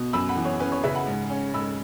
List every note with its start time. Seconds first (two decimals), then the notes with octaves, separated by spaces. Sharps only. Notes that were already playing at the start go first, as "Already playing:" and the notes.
Already playing: B2
0.13 F#2 B5 E6
0.29 F#5 B5
0.37 E3
0.45 C#5
0.60 C#4 B4
0.72 C#5
0.83 C#3 B4 E5
0.95 F#5 B5
1.07 G#2
1.30 C#4
1.54 G#2 B5 E6